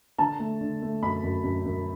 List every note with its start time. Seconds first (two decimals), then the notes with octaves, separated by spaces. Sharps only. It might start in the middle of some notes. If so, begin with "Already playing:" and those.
0.18 D3 A5
0.39 A3
0.61 D3
0.82 A3
1.03 F#2 B5
1.23 F#2
1.44 F#2
1.65 F#2